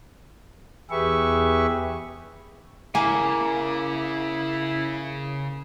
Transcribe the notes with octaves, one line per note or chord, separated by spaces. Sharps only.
E2 G4 G#4 B4 E5 C#6
C#3 A#3 E4 G#5